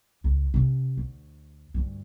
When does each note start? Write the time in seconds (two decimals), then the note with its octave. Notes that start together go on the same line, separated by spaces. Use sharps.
0.24 C#2
0.54 C3 C#4
0.97 D2
1.74 D2 G2